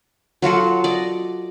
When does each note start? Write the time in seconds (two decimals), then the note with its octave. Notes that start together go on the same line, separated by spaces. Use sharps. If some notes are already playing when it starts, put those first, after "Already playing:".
0.42 F#3 F4 F#4 A4
0.84 D5 D#5